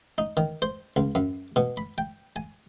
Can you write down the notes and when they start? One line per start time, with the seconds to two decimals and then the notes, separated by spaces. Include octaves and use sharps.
0.18 D#4
0.37 D#3
0.62 C5
0.96 C#2
1.15 F#2
1.56 B2
1.77 B5
1.98 G5
2.36 G#5